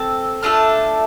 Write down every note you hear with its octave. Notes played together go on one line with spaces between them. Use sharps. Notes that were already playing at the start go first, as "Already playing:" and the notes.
Already playing: C4 A4
A3 D4 F4 A4 F6